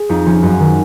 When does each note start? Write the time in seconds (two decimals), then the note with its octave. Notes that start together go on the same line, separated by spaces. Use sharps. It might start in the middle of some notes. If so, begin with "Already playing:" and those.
Already playing: G#4
0.09 F2 D#4
0.26 F3 C#4
0.43 F#2 D#4
0.60 D#3